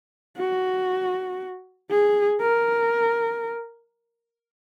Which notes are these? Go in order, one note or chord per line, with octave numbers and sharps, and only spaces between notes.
F#4
G#4
A#4